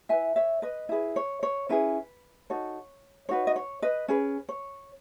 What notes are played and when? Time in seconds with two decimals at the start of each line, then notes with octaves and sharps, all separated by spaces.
0.09 E4 B4 E5 G#5
0.36 C#5 E5
0.62 B4 D#5
0.89 E4 G#4 B4
1.16 C#5
1.43 C#5
1.69 C#4 E4 G#4 B4
2.50 D#4 F#4 A4 C#5
3.29 D#4 F#4 B4 C#5
3.47 D#5
3.56 C#5
3.82 B4 D#5
4.08 C#4 G#4 B4
4.49 C#5